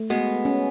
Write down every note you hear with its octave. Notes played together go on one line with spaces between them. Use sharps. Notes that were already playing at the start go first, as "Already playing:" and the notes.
Already playing: A3
G#3 B3 F#4
C#4